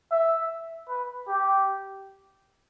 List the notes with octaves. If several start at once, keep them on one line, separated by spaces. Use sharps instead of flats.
E5
B4
G4